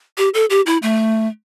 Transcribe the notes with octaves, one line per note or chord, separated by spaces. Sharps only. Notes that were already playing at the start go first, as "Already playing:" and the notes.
G4
A4
G4
E4
A3